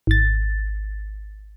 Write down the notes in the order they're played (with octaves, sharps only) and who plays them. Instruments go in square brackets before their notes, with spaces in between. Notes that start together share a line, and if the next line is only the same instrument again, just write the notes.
[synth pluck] G#1 A6